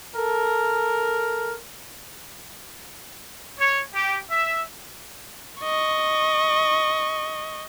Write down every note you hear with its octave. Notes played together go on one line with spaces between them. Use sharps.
A4 A#4
C#5
G4
E5
D#5 C#6